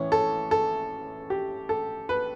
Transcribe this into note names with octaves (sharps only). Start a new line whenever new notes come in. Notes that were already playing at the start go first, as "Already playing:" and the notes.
Already playing: A2 E3 C#4
A4
A4
G4
A4
B4